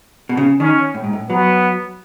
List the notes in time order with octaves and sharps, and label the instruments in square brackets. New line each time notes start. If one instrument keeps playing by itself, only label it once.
[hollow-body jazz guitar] B2
C#3
[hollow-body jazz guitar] D#3 [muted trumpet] C#4
[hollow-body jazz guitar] A2
G#2
A2
[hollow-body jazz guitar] F#3 [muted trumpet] B3